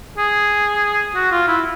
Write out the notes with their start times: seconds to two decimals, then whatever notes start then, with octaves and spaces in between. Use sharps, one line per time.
0.18 G#4
1.15 F#4
1.31 F4
1.48 E4